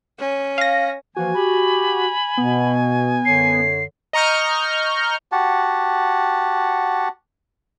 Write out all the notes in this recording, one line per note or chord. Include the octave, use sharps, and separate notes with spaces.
C#4
F5 A#6
E3 F3 A#3 F#4 G#5
G4 B5
B2 B3
F#2 D3 C#5 C7
D#5 A#5 C#6 F6 G6
F#4 G4 F#5 A5